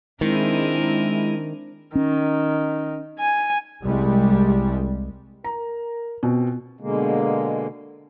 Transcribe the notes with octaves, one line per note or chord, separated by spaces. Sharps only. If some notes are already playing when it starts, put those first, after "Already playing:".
D#3 G#3 C4 D4 E4 A#4 D#7
D#3 C#4
G#5
C2 G3 G#3
A#4 A#5
B2 B3 C4
B2 D3 G#3 A#3